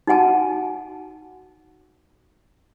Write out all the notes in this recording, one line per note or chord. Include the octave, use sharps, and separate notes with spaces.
D#4 F#4 F#5 G#5 A5